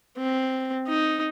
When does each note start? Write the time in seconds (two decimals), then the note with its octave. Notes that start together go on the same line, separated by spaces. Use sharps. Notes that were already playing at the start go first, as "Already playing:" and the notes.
0.17 C4
0.88 D#4